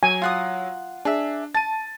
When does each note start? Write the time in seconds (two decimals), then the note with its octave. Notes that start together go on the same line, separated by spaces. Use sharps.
0.03 F#3 G#5
0.22 F4 F#5 D#6
1.05 D4 G#4 E5
1.55 A5 A6 D#7